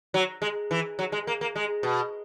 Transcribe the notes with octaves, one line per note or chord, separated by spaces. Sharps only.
F#3
G#3
E3
F#3
G#3
A#3
A#3
G#3
B2